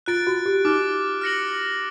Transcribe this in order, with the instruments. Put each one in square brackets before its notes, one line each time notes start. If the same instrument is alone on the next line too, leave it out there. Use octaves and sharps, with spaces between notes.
[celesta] F4 [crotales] F#6 A6 D7
[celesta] F#4
G4
[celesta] D#4 [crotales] D6 F6 A6
[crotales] F6 A#6 C#7 F#7